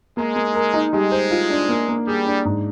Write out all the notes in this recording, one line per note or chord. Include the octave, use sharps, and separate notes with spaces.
G#3 A#3
A#3
A#4
D#4
G3 G#3
C5
F4
D4
A#3
A#3
G3 G#4
D4
G#2